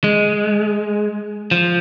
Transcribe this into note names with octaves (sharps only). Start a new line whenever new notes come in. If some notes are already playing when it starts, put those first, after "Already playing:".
G#3
F3